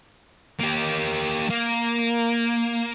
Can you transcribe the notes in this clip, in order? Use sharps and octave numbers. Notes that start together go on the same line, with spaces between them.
A#3 G4
A#3